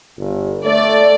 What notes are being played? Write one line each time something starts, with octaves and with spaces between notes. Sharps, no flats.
G1
A3 D5